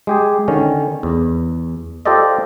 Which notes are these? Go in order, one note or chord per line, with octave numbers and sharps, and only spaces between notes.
G#3 G4 G#4
D3 D#3 C#4
E2
F4 G4 A4 C5 D5 D#5